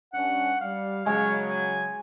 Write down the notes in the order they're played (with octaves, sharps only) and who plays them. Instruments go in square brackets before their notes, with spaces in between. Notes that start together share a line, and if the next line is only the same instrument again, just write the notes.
[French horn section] G2 C#4 D4 [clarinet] F#5
[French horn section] G3 [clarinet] F5
[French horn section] C#3 F#3 [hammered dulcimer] G#3 [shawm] C#5
[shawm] G#5